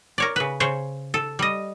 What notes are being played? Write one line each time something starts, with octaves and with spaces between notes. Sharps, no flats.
A#4 C#5 D5
C#3 B4
C#3 C5 C#5
A4
G3 D#5